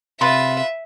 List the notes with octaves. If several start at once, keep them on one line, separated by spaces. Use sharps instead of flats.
C3 F4 B4 E5 B5 C6